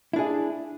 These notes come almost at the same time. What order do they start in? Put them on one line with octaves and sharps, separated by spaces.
E4 D4 G#4